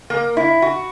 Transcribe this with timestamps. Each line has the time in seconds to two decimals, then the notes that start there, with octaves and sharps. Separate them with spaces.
0.10 A#3
0.37 E4
0.62 F#4